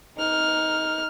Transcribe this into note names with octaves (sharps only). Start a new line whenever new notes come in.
D#4 F6